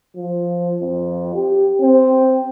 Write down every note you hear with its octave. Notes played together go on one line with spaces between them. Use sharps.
F3
F2
G4
C4